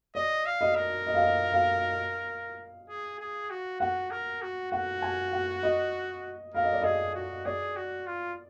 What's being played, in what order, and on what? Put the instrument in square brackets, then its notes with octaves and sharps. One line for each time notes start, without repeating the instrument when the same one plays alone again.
[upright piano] D5 [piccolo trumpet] D#5
[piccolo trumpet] F5
[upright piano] D#5
[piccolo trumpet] A#4
[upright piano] D#5
F5
D#5
F5
[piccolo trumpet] G#4
G#4
F#4
[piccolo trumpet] F#4 [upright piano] F#5
[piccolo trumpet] A#4
F#4
[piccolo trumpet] F#4 [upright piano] F#5
[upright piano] G#5
F#5
D#5
[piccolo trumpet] A#4 [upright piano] F5
[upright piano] D#5
D5
[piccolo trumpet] G#4 [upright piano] D#5
[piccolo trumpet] F#4
[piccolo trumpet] G#4 [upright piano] D5
[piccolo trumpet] F#4
F4